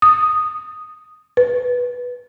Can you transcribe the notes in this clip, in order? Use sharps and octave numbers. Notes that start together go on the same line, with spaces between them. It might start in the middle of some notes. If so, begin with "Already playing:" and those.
D#6
B4